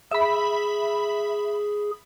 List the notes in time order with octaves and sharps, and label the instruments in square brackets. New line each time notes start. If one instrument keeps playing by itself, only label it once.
[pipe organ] G#4 [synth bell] E5 B5